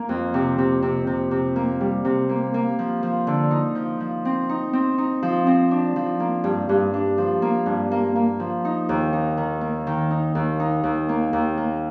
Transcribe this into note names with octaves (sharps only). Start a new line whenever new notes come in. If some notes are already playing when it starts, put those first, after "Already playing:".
Already playing: A#3
F2
C3
C3
C3
C3
C3
A#3
G3
C3
A#3
A#3
F3
F3
D3
D#4
F3
F3
C4
D#4
C4
D#4
F3
C4
D4
F3
A#3
G2
G2
D4
F3
A#3
G2
A#3
A#3
F3
D#4
D#2
D#4
D#3
A#3
D#3
D#4
D#2
D#4
D#2
A#3
D#2
A#3